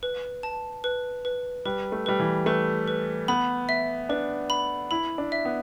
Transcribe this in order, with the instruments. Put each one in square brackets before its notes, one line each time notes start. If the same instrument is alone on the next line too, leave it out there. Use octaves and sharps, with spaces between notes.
[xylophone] B4
A5
B4
B4
[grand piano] G3 [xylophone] B4
[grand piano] A3
[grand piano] G3 [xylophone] B4
[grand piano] E3
[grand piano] A3 [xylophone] B4
[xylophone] B4
[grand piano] B3 [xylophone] B5
[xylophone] E5
[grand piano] D4 [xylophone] B4
[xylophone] B5
[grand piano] E4 [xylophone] B5
[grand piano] D4
[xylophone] E5
[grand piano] B3